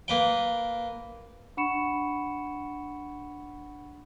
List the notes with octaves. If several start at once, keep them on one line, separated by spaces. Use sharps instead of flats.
A#3 B4 G5
D4 F#5 B5 C#6 C#7 E7